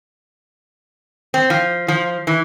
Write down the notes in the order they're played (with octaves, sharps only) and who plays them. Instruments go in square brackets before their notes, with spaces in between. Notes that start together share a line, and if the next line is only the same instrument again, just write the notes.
[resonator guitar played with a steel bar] C4
F3
F3
E3